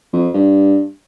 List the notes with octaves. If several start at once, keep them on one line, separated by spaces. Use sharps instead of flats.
F2
G2